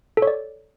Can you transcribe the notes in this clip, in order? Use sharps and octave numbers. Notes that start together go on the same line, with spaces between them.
A4
C#5
D5